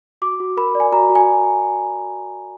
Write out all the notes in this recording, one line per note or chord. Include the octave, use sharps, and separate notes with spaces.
F#4 D6
F#4
A#4 B5
D5
G#5
F#4 A#5
F#4
G#5